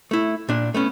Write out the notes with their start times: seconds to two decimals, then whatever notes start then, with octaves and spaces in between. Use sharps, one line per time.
0.11 A3 E4
0.49 A#2 D4
0.74 A3 B3 C#4